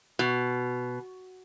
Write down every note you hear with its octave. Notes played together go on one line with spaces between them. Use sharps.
B2